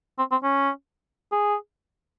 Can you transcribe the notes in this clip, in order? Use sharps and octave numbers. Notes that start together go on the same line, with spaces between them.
C4
C4
C#4
G#4